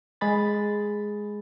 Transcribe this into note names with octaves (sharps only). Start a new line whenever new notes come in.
G#3 G#4 B5 A6